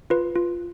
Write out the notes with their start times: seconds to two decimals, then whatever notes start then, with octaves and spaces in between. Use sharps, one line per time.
0.10 F4 B4
0.35 F4